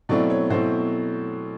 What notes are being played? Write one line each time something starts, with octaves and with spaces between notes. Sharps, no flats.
B2 F#3 A3 C4 E4 D5
C#5
B2 F#3 A3 C4 E4 C5